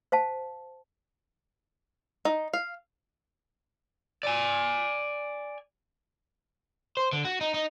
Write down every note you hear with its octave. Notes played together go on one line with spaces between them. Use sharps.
C5 F5 A5
D#4
F5
D5 G#5
C5
D3
F#4
D#4
D#4